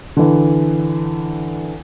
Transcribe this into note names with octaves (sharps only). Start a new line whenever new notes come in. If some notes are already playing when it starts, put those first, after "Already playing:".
D3 E3